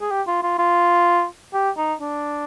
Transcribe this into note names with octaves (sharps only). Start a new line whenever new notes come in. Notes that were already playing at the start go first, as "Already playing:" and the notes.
G#4
G4
F4
F4
F4
G4
D#4
D4